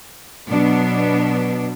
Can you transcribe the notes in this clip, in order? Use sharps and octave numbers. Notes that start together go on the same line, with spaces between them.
B2 F#3 B3 D4